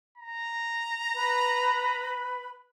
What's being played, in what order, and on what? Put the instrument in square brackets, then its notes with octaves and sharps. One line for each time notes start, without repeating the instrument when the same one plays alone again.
[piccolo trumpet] A#5
[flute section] B4 B5